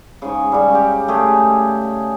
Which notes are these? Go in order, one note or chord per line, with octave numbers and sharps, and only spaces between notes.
G#2 C#3
C#3 G3
C#4 G4
A3 G4 G#4